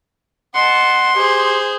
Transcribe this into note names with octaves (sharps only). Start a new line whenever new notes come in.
D#5 F#5 A5 C6
G4 G#4 C5